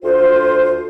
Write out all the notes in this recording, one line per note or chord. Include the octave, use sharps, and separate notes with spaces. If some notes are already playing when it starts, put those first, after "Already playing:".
D2 F4 C5